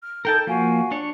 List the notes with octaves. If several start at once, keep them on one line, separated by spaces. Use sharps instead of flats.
F6
D#4 A4 A#4 G5 A5 G6
F3 A#3 F#4 F5 G#5
D4 C#5